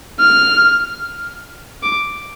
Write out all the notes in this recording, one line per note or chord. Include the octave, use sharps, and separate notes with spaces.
F6
D6